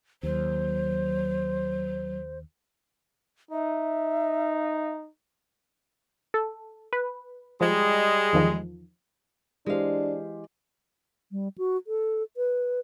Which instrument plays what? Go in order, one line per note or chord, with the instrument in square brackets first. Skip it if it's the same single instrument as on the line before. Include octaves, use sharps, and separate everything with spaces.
[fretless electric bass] D#2 [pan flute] F#3 [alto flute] C5
[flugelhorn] D#4 [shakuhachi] E5
[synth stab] A4
B4
[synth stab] F3 [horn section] G3 G#3
[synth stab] E2 D#3 F3
[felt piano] E3 G4 C5 [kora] G#3 F5 [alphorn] D4
[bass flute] G3
F#4
A4
B4